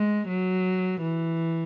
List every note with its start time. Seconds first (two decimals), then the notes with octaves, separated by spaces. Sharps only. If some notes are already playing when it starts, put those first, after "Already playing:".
Already playing: G#3
0.28 F#3
1.02 E3